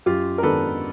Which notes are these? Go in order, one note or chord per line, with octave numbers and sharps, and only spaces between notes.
F#2 F4 G4
A#4
D#3 G#3 B3 D4 A4 B4